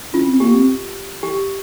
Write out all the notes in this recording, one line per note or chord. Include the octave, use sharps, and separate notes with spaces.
C#4 F4
C4
A#3 G4
C4
G4